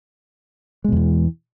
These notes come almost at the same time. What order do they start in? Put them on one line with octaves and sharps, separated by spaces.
G#3 B2 E2 E3